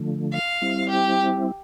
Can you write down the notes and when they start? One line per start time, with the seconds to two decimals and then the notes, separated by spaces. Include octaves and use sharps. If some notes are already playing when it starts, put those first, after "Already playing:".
Already playing: D3 F3 A3
0.33 F5
0.62 G3 C4 E4
0.90 G4